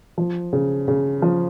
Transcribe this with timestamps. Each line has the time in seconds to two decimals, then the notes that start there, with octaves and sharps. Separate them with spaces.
0.18 F3
0.53 C#3
0.88 C#3
1.22 F3